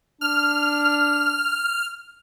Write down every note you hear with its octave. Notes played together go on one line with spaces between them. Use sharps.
D4 F6